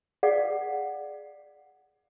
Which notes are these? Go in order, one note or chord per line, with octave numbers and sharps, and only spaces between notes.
G#4 B4 D5 F5 F#5